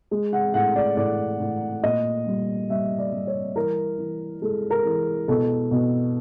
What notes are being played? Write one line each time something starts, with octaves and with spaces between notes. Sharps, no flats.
G#3
F#5
A2 F#5
D5
A2 D5
A2
A#2 D#5
G3
G3 E5
D5
G3
C#5
E3 A#4
E3
G#3 A4
A#4
E3
B2 A4
B2